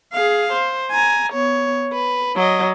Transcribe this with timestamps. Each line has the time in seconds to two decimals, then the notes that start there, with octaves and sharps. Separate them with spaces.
0.13 G#4 F5
0.53 C5
0.91 G#5 A#5
1.33 B3 C#5
1.93 B4
2.36 F#3 D#5